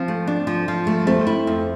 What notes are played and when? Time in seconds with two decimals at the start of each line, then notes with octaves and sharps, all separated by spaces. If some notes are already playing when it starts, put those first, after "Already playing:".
Already playing: F3 C4
0.08 A3
0.27 D4
0.47 F3
0.68 F3
0.87 A3
1.07 A3 C4
1.27 E4
1.47 F2